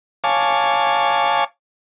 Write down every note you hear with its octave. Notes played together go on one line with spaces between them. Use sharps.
C#5 F5 G#5 A5 D6